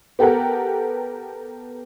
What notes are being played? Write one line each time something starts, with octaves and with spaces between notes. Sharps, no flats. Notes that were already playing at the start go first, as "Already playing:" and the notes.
B3 G4 A4 A#4 F#5